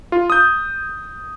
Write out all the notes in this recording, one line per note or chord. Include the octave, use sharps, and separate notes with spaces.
F4
D#6 G6